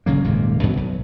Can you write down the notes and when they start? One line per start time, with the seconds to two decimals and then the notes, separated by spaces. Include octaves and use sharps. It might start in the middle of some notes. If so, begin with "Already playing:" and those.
0.06 G1 C#3 F#3 A#3
0.24 D#1 G#2 C3 A#3
0.63 F#2 B2 E3 F#3
0.77 B1